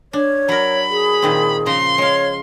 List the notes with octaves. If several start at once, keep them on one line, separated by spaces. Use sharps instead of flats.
D4 C#5
F#3 A#4 B5
G#4
A#2 D#3 C4
C#3 F3 A#5 C6
G#3 C#5 F5